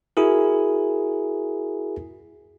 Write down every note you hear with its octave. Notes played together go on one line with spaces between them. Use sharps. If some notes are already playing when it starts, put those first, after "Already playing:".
E4 F#4 G#4 A#4